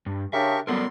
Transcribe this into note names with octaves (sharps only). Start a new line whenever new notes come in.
G2
C#3 D4 G4 A#4 E5 C#6
D3 F#3 G3 B3 A4 A#4 C6